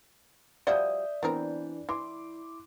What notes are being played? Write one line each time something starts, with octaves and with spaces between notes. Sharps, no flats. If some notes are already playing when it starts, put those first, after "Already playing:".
F3 G3 F#4 D5 E5 D#6 G6
E3 B3 C4 D4 A#4
E3 E4 C6 D6